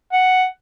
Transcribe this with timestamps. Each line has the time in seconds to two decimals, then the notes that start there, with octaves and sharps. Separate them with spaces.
0.12 F#5